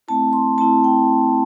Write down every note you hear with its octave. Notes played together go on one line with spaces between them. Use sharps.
A3 C4 E4 A5
C6
A3 C4 E4 A5
G5